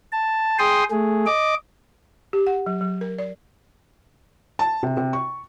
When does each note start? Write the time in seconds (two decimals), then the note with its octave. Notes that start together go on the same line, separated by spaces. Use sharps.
0.12 A5
0.59 G#4 G5 C6 D#6
0.91 A3 G#4
1.26 D#5 D6
2.33 G4
2.47 F#5
2.66 F#3
2.81 F#3
3.01 A#4
3.19 D5
4.59 A5
4.83 C3
4.97 C3
5.13 C#6